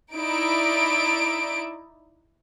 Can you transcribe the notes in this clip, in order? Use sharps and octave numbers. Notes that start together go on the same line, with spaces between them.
D#4 E4 D5 D7